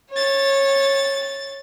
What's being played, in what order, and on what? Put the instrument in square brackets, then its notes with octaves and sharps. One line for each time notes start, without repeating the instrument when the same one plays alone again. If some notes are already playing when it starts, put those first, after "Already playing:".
[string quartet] C#5 A6